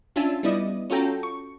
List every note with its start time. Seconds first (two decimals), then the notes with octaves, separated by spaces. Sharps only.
0.16 C#4 D4 F4 E5 G#5 A5
0.43 G3 B3 E4 D5 D#5 D#6
0.90 C#4 F4 F#4 A4 G5 A#5
1.23 C#6